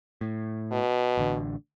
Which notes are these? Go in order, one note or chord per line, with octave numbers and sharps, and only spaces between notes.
A2
B2
A1 D3